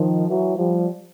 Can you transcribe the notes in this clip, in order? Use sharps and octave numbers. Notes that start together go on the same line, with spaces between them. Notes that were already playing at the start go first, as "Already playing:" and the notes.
Already playing: D#3 F3
E3 F#3
F3 G3